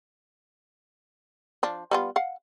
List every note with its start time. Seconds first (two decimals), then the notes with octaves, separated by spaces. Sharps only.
1.63 F3 D4
1.91 G3 B3 F4
2.16 F5 F#5